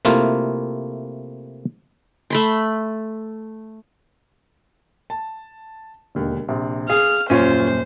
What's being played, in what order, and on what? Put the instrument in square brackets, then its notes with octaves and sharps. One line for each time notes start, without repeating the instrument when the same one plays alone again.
[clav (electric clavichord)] C3 A3 A#3 E4 F4
[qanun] A3 B5 C6
[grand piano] A5
E1 D#2 D3
[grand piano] A#1 [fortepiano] C3
[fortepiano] G#4 [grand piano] F5 [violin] F6
[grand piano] D#1 F#2 A#2 [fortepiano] C#4 F4 C#5 [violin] C5